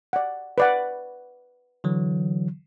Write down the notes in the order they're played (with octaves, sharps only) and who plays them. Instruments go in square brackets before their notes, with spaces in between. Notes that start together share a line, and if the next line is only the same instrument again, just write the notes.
[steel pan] D5 F#5
B4 D5 F#5
[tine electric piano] D3 E3 F#3